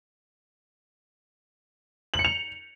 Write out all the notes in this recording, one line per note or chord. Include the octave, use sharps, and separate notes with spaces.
F#7
C#7
F7